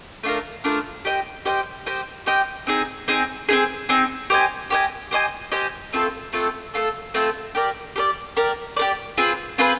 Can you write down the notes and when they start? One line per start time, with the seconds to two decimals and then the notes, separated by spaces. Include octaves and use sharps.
0.23 A3 D4 F4 A#4
0.64 A3 D4 F4 A#4
1.05 G4 C5 D#5 G5
1.45 G4 C5 D#5 G5
1.86 G4 C5 D#5 G5
2.26 G4 C5 D#5 G5
2.67 C4 D#4 G#4
3.08 C4 D#4 G#4
3.49 C4 D#4 G#4
3.89 C4 D#4 G#4
4.30 G4 C5 D#5 G#5
4.70 G4 C5 D#5 G#5
5.11 G4 C5 D#5 G#5
5.52 G4 C5 D#5 G#5
5.92 A3 C4 F4 A4
6.33 A3 C4 F4 A4
6.74 A3 C4 F4 A4
7.14 A3 C4 F4 A4
7.55 G4 A#4 D5
7.96 G4 A#4 D5
8.37 G4 A#4 D5
8.77 G4 A#4 D5
9.18 C4 F4 G#4 B4
9.58 C4 F4 G#4 B4